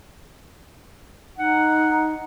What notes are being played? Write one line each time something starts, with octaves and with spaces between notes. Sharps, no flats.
D#4 F#5